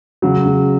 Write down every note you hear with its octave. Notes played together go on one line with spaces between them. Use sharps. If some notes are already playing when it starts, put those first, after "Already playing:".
C#3 F#3
C#3